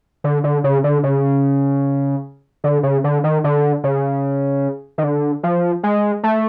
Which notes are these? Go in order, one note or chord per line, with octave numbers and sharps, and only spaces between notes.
D3
D3
C#3
D3
C#3
D3
C#3
D3
D#3
D3
C#3
D#3
D3
F3
G#3
A3